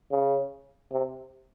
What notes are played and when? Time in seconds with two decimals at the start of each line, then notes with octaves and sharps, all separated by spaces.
0.11 C#3
0.92 C3